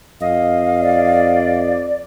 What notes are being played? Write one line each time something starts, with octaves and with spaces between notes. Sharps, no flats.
F2 D#5 F5
D5